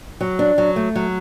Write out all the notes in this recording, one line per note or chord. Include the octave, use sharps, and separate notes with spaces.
F#3
D4
F#3
A3
F#3